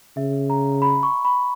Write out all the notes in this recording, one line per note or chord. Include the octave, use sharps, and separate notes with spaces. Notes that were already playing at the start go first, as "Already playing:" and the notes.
C#3 E5
A#5
B5
C#6
B5